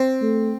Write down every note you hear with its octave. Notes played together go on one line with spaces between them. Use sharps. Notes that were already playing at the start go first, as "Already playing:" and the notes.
Already playing: C4
A3